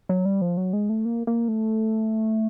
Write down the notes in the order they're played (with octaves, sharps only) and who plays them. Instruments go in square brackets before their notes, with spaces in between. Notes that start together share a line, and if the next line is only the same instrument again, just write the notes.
[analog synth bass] F#3
G3
F3
F#3
G#3
A3
A#3
A#3
A3